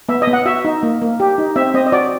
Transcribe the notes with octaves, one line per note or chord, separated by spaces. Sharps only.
B3 E5
D#5
B3
F#5
F#4 E5
D#4
A#3
A#3
G4
D#4
C4 E5
C4 D#5
D#5
F#4 D5